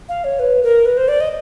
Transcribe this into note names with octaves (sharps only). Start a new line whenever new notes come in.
F5
C#5
B4
A#4
B4
C5
D5
D#5